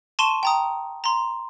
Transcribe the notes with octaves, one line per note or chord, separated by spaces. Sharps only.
A5 C6 C#6 D#7 E7 G7
G5 A#5 D#6
A#5 C6